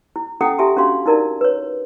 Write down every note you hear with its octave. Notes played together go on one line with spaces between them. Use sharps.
E4
C#4 E4 A4 F#5 G5 D#6
E4 G4 E5 G#5 A5 C6
C#4 D4 F#4 F5 C6
D#4 E4 A#4 D5 A5
B4 C#5